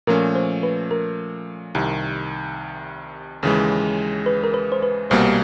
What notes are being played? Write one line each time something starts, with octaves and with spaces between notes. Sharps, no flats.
A#2 F3 A3 C#4 A#4
C5
B4
A#4
C2 C3 D#3
D#2 C#3 E3 G#3
B4
A#4
B4
C5
B4
C2 B2 G3 A#3 C5